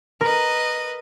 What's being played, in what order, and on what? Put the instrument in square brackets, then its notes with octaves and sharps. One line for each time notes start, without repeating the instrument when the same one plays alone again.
[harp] A#4 [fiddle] B4 D#5